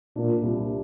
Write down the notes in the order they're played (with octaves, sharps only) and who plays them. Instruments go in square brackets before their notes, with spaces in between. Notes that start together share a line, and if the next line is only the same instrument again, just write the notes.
[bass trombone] A#2 [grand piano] D4
[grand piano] C2